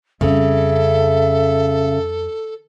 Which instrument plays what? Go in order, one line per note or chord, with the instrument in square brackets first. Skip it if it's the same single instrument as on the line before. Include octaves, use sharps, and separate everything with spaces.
[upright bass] F2 G3 [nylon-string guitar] C#3 [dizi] A4 [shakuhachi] E5